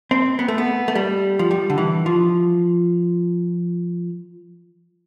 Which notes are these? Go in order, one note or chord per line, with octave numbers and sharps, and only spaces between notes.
C4
B3
A3
B3
A3
G3
F3
G3
D3
E3
F3